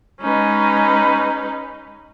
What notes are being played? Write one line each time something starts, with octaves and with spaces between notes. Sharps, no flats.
G#3 C#4 D#4 B4